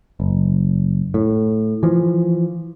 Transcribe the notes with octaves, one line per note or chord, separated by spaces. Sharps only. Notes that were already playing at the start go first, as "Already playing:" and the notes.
F#1
A2
E3 F3